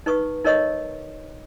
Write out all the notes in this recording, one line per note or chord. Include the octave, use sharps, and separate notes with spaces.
D#4 B4 C#6 D#6
D#4 A#4 C#5 D#5 C#6 D#6